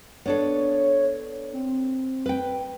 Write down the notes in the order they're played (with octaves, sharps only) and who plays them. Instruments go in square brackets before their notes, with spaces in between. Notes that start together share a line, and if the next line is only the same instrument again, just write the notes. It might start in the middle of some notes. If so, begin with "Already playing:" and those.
[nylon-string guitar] B3 D4 A4 [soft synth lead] C#5
[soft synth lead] C4
[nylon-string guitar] B4 G5